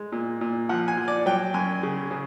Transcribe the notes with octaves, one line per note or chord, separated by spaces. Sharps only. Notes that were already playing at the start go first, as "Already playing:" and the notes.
Already playing: G#3
A#2
A#2
F3 F#5
G#5
F3
D5
F#3 G5
F#2 G#5
C#3
C#3